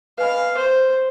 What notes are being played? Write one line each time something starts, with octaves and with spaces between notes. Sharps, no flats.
B4 D#5 F5 G#5 B5
C5